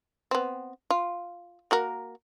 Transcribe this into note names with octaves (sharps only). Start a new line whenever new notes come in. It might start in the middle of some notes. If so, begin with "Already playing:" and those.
B3 C4
F4
A#3 F#4 A#4